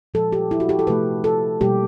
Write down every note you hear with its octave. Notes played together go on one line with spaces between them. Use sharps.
A#2 F3 G#3 A4
G4
E4
F#4
G4
A4
C3 F3 A3 B4
A4
B2 G3 A#3 G4